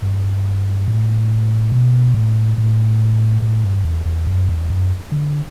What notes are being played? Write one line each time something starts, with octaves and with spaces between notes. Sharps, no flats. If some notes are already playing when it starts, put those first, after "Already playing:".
G2
A2
B2
A2
A2
A2
G2
E2
E2
F#2
E2
F#2
D3